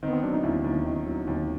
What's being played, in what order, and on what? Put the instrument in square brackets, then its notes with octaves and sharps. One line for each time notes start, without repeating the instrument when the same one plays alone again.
[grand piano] D#3 [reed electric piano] C4
[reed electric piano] B3
C4
[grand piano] F#3 [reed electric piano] D4
[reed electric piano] D#4
[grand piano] D#2 [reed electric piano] E4
[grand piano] D#2
D#3
F#3
D#2